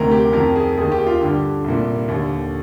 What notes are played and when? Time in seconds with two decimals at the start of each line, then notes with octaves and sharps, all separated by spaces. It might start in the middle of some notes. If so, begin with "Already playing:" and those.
Already playing: D2 C3 D#3 A#4
0.11 G4
0.33 F2 D#3 A#4
0.56 G#4
0.77 D#2 D#3 G#4
0.92 G4
1.06 F4
1.21 G2 D3 G4
1.64 C2 A#2
2.08 D#2 D3